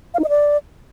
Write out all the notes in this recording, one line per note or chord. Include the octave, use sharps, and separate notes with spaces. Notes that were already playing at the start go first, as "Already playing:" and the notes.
F5
D#4
D#5
D5